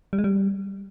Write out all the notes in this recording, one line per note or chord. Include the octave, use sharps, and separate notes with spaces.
G3
G#3
G3